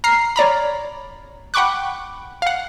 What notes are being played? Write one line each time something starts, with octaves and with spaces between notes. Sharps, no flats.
A#5 F6 C7
C#5 D5 A#5 B5
F#5 G5 B5 C#6 D6 F#6
F5 F#5